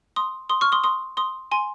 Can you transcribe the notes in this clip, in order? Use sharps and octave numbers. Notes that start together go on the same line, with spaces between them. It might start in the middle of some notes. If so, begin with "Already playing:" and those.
C6 D#6
C6 D#6
C#6 F6
C6 D#6
C6 D#6
C6 D#6
G#5 C6